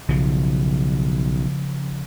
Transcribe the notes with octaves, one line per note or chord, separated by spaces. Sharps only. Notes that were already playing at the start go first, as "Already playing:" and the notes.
B1 C#3 F3